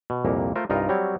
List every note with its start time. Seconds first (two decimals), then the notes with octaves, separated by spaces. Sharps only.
0.10 B2
0.25 C2 F2 A#2 A#3
0.56 A3 F4 A#4 C5
0.70 C2 G2 D#4 F4 A#4
0.89 F#3 G3 C4 C#5